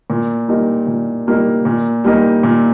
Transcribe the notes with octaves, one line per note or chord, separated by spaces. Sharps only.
A#2
G3 A#3 D#4
A#2
G3 A#3 D#4
A#2
G3 A#3 D#4
A#2